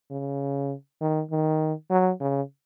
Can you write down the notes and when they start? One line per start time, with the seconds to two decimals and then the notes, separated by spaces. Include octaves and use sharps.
0.11 C#3
1.01 D#3
1.31 D#3
1.91 F#3
2.20 C#3